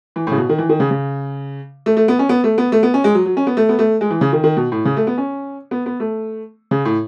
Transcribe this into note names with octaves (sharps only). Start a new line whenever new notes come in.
E3
A2
C#3
B2
D#3
E3
D#3
C#3
C#3
A3
A3
B3
C#4
B3
A3
B3
A3
B3
C#4
G#3
F#3
F#3
C#4
B3
A3
B3
A3
G#3
E3
C#3
D#3
D#3
B2
A2
C#3
A3
B3
C#4
B3
B3
A3
C#3
A2